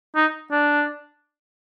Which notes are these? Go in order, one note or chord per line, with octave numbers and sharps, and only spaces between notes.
D#4
D4